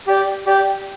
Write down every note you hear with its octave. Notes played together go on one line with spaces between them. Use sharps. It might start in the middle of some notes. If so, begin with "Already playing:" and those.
G4 D5 G5
G4 D5 G5